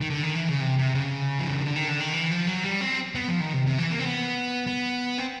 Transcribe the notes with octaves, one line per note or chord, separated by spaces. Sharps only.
D#3
D3
D#3
E3
C#3
C3
C3
C#3
F3
E3
D#3
D3
D#3
D3
D#3
E3
F3
F#3
G3
C4
B3
F3
D#3
C3
C3
E3
A#3
C4
B3
B3
C4